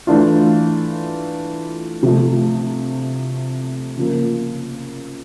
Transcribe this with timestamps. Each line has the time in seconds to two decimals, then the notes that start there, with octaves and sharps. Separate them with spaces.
0.07 E3 A3 D4 F4
2.03 C3 F3 A3
3.97 C#3 F3 A#3